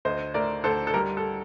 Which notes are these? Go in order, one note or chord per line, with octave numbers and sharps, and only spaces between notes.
D2 C5 D#5
A3 A#4 D5
D2 A4 C5
A4
G3 A#4
A4